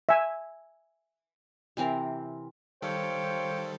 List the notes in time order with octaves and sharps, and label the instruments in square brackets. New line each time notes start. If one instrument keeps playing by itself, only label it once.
[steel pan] E5 G#5
[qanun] C3 E3 C4 A#4
[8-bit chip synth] D#3 G3 A4 [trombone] C5 [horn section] C#5 F5 G5